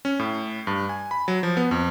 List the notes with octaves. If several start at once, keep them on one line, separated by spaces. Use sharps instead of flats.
C#4
A2
G2
G#5
B5
F#3
F3
B3
F2